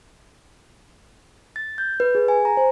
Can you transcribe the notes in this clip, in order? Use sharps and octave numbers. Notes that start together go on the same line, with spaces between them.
A6
G6
B4
G#4
G#5
A#5
C5